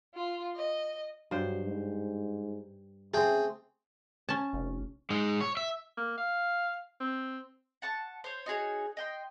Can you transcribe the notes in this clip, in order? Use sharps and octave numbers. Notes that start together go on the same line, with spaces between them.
F4
D#5
G2 F#3 C5
G#2
C#3 A3 C4 G#4 G5
C#4 A5
F1
G#3 D#4
C#5
E5
A#3
F5
C4
F#5 A5 C#6
C5 C#5
D#4 F#4 G#4 C#5
D#5 G5 C6